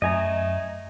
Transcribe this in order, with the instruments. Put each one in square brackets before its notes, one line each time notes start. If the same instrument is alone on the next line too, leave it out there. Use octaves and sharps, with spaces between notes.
[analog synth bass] F#2 [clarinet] A3 [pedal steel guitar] D#5 G#5 A#5